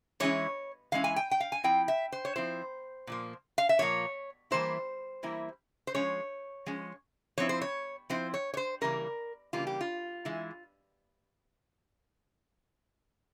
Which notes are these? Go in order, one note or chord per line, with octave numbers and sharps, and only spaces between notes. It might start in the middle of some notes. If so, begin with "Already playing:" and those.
E3 G#3 C#4 E4 C#5
E3 G#3 C#4 E4 F5
G#5
G5
G5
F5
G#5
F3 C4 E4 G5
E5
C5
C#5
F3 C4 E4 C5
A#2 F3 A#3
F5
E5
A#2 F3 A#3 C#5
E3 G3 A#3 E4 C5
E3 G3 A#3 E4
C5
F3 G#3 C#4 C#5
F3 G#3 C#4
F3 C4 E4 C#5
C5
C#5
F3 C4 E4 C5
C#5
C#5
C5
C#3 E3 G3 A#3 A#4
C#3 E3 G3 A#3 F4
G4
F4
E3 G#3 E4